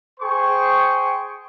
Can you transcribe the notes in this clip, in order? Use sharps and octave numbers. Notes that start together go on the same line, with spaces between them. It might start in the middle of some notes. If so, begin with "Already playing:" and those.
G#4 C5 G5 C6 C#6